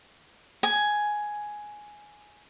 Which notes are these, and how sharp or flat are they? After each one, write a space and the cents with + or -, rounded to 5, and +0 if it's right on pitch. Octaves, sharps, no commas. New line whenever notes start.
G#5 +5